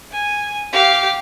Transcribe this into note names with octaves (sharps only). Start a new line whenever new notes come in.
G#5
G4 F5